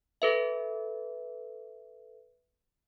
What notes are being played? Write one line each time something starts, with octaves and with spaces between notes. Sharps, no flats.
A4 B4 E5